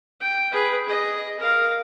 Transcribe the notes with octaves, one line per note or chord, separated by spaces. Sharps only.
G5
G#4 B4
G#4 D#5
A#4 F5